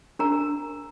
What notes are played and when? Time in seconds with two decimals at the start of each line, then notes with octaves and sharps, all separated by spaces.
0.19 D4 A#4 A#5